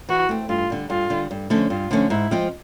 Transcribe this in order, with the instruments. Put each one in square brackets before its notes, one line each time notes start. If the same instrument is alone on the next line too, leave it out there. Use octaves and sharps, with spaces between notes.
[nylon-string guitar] E3 [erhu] F#4
[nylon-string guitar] A3 C4
[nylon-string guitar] G2 [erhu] F4
[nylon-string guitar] D3 G3
[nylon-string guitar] G2 [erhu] F4
[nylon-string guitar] D3 G3
G2
D3 F3 A3 C#4
[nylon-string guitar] G2 [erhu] F4
[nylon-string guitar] D3 F3 A3 C#4
[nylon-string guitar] G#2 [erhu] E4
[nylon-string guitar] F3 G#3 C4 F4